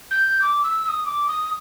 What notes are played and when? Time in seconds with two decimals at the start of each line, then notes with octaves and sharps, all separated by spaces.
0.11 G6
0.42 D6
0.63 E6
0.84 E6
0.88 D#6
1.06 D6
1.28 D#6